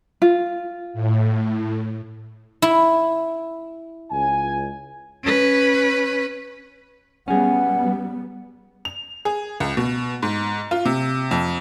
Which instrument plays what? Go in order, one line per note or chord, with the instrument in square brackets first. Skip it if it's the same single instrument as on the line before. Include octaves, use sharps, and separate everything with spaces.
[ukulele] F4
[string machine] A2
[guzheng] E4
[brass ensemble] C#2 G#5
[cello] C#4 B4
[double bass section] G3 B3 [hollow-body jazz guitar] C#4 G#4 [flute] F#5
[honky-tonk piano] F7
G#4
C#2
B2
G#2
F4
C3
F2